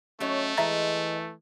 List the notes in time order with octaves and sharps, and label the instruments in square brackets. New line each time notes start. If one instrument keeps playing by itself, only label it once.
[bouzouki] F#3 D#4 C#5 [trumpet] A3 [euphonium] C#4
[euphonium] E3 [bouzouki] G#3 D#5 [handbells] E5 A#5 A6